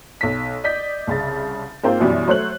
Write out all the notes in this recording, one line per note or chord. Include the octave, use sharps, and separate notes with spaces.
B1 B6
D5 D#5 G6 B6
C2 C#3 A6
G#2 A#3 C4 F4 C5 F5
F#2 B2 E3 G3
F#3 A3 C5 C#5 F#6 F#7